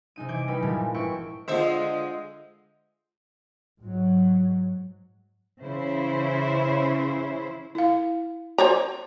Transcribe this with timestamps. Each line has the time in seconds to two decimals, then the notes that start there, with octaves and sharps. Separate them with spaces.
0.16 C3 G#3 D#4 D#7
0.29 E3 D6 G6 G#6
0.48 G3 D#4 E4 G4 B4
0.62 A#2 E3 F3 G3 G#3
0.94 G#1 E4 B4 G5 C#6 D7
1.48 D3 G#3 F4 C5 D#5 E5
3.81 G#2 F#3
5.64 C#3 E3 E4 C5
7.75 E4 F5
8.58 C5 D5 A#5